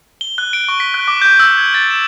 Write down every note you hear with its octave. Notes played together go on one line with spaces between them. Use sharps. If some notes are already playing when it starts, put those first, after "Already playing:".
G7
F#6
D7
C#6
B6
F#6
D6
G6
E6
G#6
A6
E7